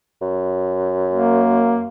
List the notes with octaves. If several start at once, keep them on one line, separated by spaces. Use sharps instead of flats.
F#2
A#3